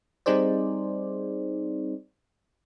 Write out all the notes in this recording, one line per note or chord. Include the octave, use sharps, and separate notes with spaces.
G3 C4 D#4 G#4 C5 D5